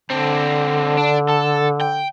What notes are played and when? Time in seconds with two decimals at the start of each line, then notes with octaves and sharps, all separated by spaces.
0.11 D3 C4 D4
0.97 D4
1.29 A4
1.81 G5